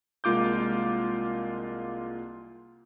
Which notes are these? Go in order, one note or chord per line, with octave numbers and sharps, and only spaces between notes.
C2 G#3 A#3 F4 D6 G6